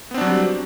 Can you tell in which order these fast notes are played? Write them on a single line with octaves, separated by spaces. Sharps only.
B3 C4 D4 F#3 G3